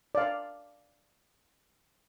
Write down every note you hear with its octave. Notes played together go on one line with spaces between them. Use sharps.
D5 F5